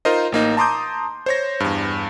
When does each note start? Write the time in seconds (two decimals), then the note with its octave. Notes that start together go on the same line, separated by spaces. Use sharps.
0.05 D#4 F4 A#4 C5 D#5
0.32 A1 A#3 D#4
0.57 A5 A#5 C6 D6 D#6 G6
1.26 C5 C#5 A#6
1.60 E2 G2